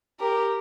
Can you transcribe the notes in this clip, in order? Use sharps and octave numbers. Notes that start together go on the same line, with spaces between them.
G4 A#4